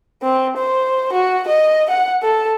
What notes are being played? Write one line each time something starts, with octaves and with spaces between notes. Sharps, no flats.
C4
C5
F#4
D#5
F#5
A4